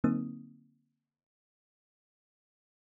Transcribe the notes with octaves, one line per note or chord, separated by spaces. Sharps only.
D3 F#3 A#3 C4 D#4 D#6